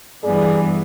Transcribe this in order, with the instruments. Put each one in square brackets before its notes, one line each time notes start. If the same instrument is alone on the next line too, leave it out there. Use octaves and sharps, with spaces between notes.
[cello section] G2 E3 B3 [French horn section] G#4 D5